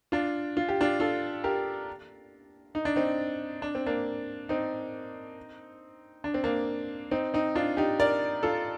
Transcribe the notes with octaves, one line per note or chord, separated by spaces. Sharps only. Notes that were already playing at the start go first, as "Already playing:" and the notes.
D4 F4
F4
G4
D4 F4
F4 A4
G4 A#4
D#4
D4
C4 D#4
D4
C4
A#3 D4
C4 D#4
D4
C4
A#3 D4
C4 D#4
C4 D#4
D4 F4
D#4 G4
A#4 D5
F4 A4